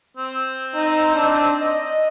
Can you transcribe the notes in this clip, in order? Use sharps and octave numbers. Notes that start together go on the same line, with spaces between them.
C4
D#4
D4
D#5